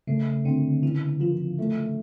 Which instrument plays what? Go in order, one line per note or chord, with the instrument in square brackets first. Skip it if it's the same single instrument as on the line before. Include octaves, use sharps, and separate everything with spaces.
[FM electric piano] C#3 [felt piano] A3
[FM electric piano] D3 [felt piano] C4
[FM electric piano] E3 [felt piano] C#4
[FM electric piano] F3 [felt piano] F4
[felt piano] A3